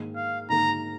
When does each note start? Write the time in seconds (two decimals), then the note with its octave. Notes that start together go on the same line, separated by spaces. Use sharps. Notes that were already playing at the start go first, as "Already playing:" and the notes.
Already playing: G#2 D#3 A#3
0.16 F5
0.49 G#2 D#3 A#3 A#5